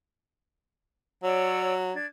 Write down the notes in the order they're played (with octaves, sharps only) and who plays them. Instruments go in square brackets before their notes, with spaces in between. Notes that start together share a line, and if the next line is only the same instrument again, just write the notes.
[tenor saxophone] F#3 [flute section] C#5 D5 E6
[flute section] D4 G#6